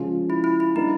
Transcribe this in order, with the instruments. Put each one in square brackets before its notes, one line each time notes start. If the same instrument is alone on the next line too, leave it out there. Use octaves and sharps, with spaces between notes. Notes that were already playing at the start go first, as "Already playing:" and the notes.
Already playing: [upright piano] C#3 F3 G#3 C#4 F4
[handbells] E4
E4
E4
[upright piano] G3 A#3 D4 [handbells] D#4